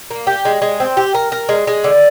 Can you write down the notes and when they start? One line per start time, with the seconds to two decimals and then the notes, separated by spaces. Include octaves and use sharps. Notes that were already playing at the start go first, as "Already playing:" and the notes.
0.11 A#3
0.27 G4
0.45 G#3
0.62 G#3
0.80 C4
0.97 G4
1.14 A#4
1.32 A#4
1.49 G#3
1.67 G#3
1.84 D3